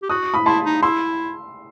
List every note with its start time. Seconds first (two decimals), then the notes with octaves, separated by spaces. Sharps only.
0.02 G4
0.09 F#4 D#6 F#6
0.34 B5 D#6
0.46 E4 A5 C6
0.65 D#4
0.82 E4 C6 E6